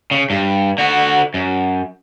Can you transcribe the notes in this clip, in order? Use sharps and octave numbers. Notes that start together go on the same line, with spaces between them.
C#3
G2
D3 F#4
F#2